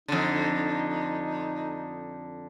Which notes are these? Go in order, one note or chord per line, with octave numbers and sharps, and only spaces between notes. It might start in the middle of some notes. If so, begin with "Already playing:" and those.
F2 D3 D#4